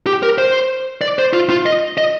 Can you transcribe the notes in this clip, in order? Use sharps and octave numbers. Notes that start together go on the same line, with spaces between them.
G4
A#4
C5
D5
C5
F4
F4
D#5
D#5